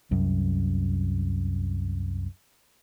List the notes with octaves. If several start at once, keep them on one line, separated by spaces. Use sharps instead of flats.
C2 F#2